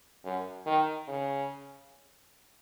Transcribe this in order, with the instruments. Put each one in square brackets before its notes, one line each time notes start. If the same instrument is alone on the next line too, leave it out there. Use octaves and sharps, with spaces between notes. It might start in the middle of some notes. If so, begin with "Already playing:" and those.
[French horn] F#2
D#3
C#3